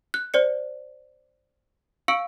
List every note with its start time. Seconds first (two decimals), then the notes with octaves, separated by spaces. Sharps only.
0.14 F#6
0.34 C5 D5 C#7
2.08 F5 C#6 E6 C#7 D7